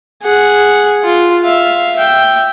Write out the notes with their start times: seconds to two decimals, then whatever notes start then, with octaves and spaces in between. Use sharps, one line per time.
0.23 G#4 F#5
1.04 F4
1.44 E5 F5
1.97 E5 G5